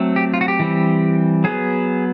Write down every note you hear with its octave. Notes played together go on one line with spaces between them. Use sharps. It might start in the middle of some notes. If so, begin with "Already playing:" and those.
Already playing: F#3 A3 C4
G4
F4
F#4
G4
E3 G3 C4
F#3 B3 G#4